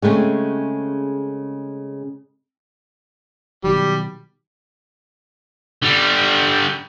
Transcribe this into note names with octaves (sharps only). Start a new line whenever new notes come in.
C#3 G#3 A3 C4 C#4
B2 D#3 F#3 G3
D3 G3